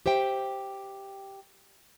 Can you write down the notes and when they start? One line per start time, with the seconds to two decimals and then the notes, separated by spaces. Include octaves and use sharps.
0.06 G4 C5 E5 G5